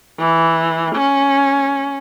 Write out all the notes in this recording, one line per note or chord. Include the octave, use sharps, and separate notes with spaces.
E3
C#4